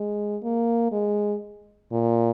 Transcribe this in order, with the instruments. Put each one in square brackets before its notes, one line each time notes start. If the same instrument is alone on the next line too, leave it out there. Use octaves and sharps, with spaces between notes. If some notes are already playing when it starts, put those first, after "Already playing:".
Already playing: [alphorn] G#3
A#3
G#3
A#2